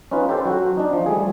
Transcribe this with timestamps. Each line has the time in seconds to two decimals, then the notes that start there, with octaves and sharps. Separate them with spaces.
0.11 C#4 D#4 F4 B4
0.29 G4 A4 C5
0.45 F#3 F#4
0.77 D4 D#4
0.93 F3
1.06 G3 A3 G#4